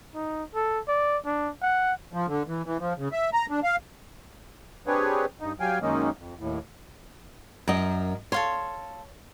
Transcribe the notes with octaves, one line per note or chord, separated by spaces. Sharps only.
D#4
A4
D5
D4
F#5
F3
D3
E3
E3
F3
C#3
E5
A#5
D4
F5
C4 D4 G4 G#4 B4 C#5
G2 D#4
F#3 G3 F5 G5 G#5
F#2 D#3 G#3 A#3 C#4 D#4
F2
D#2 A2
F#2 A#4 D#5
A4 C#5 F5 C6